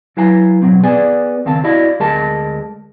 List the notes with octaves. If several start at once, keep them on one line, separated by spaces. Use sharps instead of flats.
F#3 E4 B4 F5 G#5 A#5
B2 D#3 F#3 C4
B3 G#4 B4 D5 G#5
C#2 D#3 C4 F5 A5
E4 F#4 D5 D#5 F5 B5
D2 G#3 G#4 A#4 D#5 A5